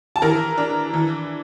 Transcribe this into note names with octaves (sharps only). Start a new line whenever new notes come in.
A5
E3 A#4 A#5
D4
E3